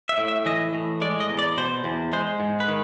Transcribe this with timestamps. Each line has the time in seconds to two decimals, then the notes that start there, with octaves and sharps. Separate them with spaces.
0.09 E5
0.18 A2
0.28 E5
0.46 E3 D#5
0.74 A2
1.02 G#3 D5
1.20 D#5
1.30 E2
1.39 D5
1.58 B2 C5
1.84 E2
2.13 G#3 C5
2.40 G#2
2.60 B4
2.68 D#3